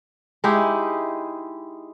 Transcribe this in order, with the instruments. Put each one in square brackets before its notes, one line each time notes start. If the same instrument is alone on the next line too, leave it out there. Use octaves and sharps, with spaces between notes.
[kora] G#3 D#4 E4 G4